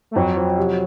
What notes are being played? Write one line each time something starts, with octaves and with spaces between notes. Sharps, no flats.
A3
F2 F#3
F3
C3